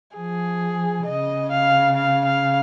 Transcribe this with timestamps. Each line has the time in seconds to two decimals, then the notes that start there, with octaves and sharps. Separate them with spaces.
0.16 F3 G#4
1.06 C#3 D#5
1.51 F5
1.96 F5
2.26 F5